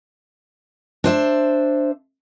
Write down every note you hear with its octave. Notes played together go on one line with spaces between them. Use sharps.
D4 C5 E5